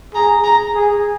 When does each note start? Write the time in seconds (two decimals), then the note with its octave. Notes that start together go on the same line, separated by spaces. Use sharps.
0.14 G#4 A#5
0.44 A#5
0.75 G#4